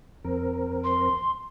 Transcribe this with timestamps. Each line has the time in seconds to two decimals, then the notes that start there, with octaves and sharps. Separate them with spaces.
0.25 F2 C4 A#4
0.84 C6